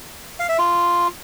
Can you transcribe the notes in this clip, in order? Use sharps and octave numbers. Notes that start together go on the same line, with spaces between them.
F5
E5
F4